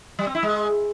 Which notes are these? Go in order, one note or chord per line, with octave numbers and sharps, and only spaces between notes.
G3
C4
E4
G#3